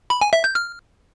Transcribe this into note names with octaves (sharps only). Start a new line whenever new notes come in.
B5
G#5
E5
G6
F6